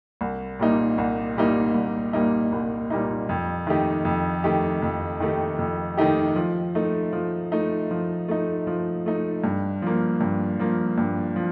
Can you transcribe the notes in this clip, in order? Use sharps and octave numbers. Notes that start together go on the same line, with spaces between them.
C2
A#2 G3 A#3 D#4
C2
A#2 G3 A#3 D#4
C2
A#2 G3 A#3 D#4
C2
A#2 G3 A#3 D#4
F2
D#3 A3 D#4 G4
F2
D#3 A3 D#4 G4
F2
D#3 A3 D#4 G4
F2
D#3 A3 D#4 G4
F3
A3 D#4
F3
A3 D#4
F3
A3 D#4
F3
A3 D#4
G2
F3 A#3
G2
F3 A#3
G2
F3